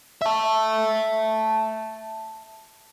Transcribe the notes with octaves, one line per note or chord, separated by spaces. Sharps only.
E5 A5